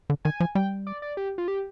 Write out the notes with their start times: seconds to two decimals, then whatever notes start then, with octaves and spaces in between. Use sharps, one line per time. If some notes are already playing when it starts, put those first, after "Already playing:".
0.10 D3
0.25 D#3 G#5
0.40 F3
0.55 G3 G5
0.87 D5
1.02 D5
1.17 G4
1.38 F4
1.48 G4